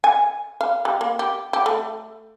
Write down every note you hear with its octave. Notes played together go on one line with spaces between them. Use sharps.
G#5
F5
G3
A#3
G4
G4
A3